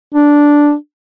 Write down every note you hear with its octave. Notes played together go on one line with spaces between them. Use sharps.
D4